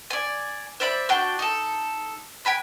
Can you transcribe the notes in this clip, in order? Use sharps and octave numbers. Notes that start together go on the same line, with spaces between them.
D5 G#5
C5 D5 E5 B5
D4 F#4 G5
D#4 A4
G5 G#5 B5 F#6